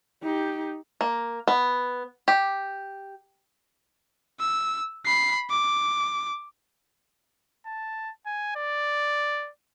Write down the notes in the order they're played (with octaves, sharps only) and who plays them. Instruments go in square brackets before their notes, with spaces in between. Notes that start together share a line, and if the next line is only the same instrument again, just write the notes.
[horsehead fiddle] D#4 G4
[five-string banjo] A#3
B3
G4
[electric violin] E6
B5 C7
D6
[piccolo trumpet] A5
G#5
D5